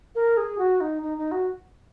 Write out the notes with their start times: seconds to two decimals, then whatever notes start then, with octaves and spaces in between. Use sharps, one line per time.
0.15 A#4
0.37 G#4
0.58 F#4
0.81 D#4
1.02 D#4
1.18 D#4
1.32 F#4